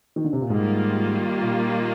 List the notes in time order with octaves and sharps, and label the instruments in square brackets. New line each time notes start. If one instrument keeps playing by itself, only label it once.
[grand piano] D#3
D3
C3
A#2
[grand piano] G#2 [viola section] D#3 G3 A#3 F4
[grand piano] A#2